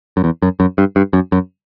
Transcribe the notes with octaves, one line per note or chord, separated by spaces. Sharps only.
F#2
E2
F#2
F#2
G2
G2
F#2
F#2